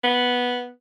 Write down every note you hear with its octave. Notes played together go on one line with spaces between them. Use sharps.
B3